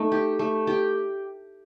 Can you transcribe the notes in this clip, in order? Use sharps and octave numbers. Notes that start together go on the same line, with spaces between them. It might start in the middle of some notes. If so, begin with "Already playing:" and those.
Already playing: A3 D#4
G4
A3
G4